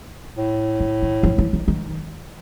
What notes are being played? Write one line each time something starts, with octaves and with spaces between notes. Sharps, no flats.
A2
D3
D#3
F3
E3
D#3
D#3